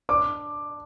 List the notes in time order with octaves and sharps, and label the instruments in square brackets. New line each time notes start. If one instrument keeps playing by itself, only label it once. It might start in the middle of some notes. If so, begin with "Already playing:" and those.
[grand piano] D4 D6